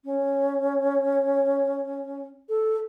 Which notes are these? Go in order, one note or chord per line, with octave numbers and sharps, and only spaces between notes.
C#4
A4